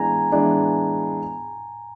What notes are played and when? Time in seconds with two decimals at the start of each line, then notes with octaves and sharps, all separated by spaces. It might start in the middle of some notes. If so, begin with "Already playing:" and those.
Already playing: E3 G#3 B3 D4 G#5 A#5
0.32 E3 G#3 B3 D4